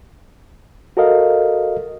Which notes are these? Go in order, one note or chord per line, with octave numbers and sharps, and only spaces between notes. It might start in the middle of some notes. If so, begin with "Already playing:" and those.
F#4 A4 A#4 D#5 F5